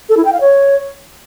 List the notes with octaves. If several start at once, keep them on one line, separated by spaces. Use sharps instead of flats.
A4
E4
G5
F5
C#5